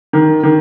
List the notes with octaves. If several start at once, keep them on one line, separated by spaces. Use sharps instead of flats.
D#3
D#3